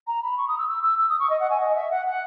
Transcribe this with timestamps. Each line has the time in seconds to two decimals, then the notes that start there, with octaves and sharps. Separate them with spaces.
0.07 A#5
0.22 B5
0.37 C#6
0.48 D#6
0.58 E6
0.68 E6
0.83 E6
0.99 E6
1.09 D#6
1.19 C#6
1.29 D#5
1.40 F#5
1.50 G#5
1.60 D#5
1.75 E5
1.91 F#5
2.06 F#5